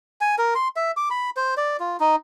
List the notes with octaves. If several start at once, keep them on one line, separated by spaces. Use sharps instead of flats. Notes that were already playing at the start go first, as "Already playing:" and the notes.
G#5
A#4
C6
E5
D6
B5
C5
D5
F4
D#4